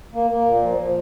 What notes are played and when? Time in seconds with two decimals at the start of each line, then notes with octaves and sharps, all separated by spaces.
0.14 A#3
0.31 A#3
0.46 A#2
0.62 F3
0.78 F3